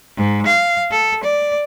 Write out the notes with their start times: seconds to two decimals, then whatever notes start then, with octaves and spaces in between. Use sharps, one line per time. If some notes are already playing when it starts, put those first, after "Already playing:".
0.17 G#2
0.46 F5
0.91 A4
1.23 D5